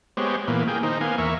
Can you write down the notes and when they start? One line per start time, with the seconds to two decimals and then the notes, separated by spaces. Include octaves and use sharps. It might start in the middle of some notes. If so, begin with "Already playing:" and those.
0.17 G#3 B3 G4 C5 C#5
0.48 A#2 E3 A#3 B3
0.68 A#3 G#4 G5
0.83 D#3 D#4 C5
1.01 A#3 B3 F5 G#5
1.18 E2 A#4 E5 C#6